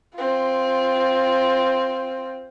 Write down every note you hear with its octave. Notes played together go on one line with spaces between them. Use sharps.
C4 F4